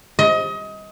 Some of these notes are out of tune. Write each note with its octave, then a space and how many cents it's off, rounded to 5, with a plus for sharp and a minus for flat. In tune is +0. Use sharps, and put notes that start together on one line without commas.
D#5 +25